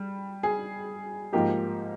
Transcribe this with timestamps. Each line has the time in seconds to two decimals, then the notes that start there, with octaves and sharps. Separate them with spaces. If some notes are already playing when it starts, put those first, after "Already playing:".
Already playing: G3
0.43 G#4
1.33 G#2 F3 A#3 D#4 G4